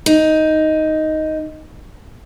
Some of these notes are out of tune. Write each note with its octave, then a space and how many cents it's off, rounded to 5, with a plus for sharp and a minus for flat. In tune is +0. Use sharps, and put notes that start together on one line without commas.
D#4 +5